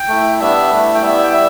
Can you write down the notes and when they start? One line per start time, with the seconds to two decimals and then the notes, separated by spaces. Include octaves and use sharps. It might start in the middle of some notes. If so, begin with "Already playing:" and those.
Already playing: G5
0.08 A3 E4
0.40 G3 B3 D4 E5
0.72 A3 E4
0.95 G5
1.01 G3 B3 E4 E5
1.23 G5
1.33 G3 E5